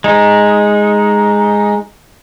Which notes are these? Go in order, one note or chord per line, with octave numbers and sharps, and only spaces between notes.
G#3 D#4